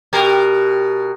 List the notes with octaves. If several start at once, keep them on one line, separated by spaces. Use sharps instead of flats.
B2 G4 A#4